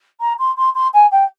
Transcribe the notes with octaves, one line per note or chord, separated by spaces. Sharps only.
A#5
C6
C6
C6
G#5
G5